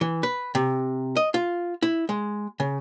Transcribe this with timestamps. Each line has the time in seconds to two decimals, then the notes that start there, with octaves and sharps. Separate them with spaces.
0.01 E3
0.23 B4
0.55 C3
1.17 D#5
1.34 F4
1.82 E4
2.09 G#3
2.60 C#3